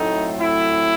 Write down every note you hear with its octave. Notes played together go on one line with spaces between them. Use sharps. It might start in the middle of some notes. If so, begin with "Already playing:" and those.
Already playing: A2 F#3 A3 C4 D#4
E4